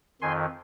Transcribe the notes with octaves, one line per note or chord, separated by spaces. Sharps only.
F2 D#3 G#5 C6